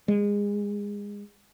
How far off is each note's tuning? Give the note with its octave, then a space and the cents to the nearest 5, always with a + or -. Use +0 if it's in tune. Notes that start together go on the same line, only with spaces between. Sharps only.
G#3 -25